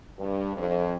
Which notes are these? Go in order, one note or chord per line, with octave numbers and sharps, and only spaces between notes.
G2
F2